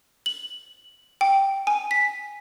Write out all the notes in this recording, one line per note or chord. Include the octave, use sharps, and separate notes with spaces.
F#7
G5
G#5
B6